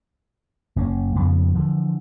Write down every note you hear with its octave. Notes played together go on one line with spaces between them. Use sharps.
F#1 A#3 C#4
F2 C#3 B3
D3 E3 F3